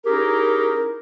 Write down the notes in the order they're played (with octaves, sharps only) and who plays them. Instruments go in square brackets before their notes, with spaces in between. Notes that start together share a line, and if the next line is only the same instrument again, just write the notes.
[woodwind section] C#4 D#4 E4 G4 G#4 A#4